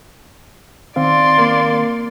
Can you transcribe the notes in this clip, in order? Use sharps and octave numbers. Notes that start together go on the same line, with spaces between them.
D#3 C4 D5 F5 C6
A#3